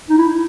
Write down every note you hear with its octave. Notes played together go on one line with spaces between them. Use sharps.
D#4
E4